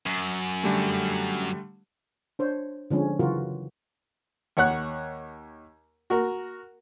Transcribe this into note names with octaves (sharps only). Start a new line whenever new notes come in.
F#2
D3 G3 A3
D4 C5 C#5
D3 F3 G#3 C#4
C#3 E3 F#3 F4 F#4 A#4
D#2 C#5 F#5 F#6
F#4 A#4